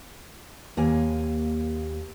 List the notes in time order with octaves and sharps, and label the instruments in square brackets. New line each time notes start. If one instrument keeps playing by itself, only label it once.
[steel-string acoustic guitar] D#2 A#3 G#5